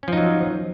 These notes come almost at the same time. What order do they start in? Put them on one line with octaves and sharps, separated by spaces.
C#4 F3 D#4 F#3